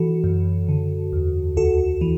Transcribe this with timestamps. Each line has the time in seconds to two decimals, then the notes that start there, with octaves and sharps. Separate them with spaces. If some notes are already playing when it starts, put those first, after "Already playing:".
Already playing: E3 F#4 A4
0.24 F#2
0.69 D3
1.13 E2
1.57 D2 F#4 A4
2.01 E3